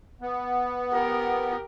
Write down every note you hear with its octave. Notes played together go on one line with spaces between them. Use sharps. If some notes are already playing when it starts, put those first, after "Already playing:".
B3
G4 A#4